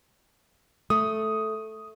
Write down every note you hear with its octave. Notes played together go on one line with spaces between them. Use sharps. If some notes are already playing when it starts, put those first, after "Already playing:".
A3 D#6